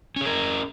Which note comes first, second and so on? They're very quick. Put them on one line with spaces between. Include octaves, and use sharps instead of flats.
C#4 G#4 A#4